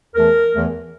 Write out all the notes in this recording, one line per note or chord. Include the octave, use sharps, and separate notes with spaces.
E2 E3 A3 A#4
E2 E3 A3